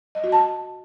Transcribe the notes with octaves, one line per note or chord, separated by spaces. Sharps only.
D#5
F#4
A5